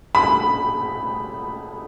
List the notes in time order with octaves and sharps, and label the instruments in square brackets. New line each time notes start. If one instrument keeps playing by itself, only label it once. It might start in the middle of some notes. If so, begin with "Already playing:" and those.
[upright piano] B5